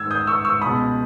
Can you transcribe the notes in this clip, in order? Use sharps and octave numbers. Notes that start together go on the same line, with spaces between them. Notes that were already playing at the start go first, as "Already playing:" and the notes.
Already playing: G#2 D#3 E6 G#6
D#6 G6
C#6 E6
C#6 E6
C#2 B2 B5 D#6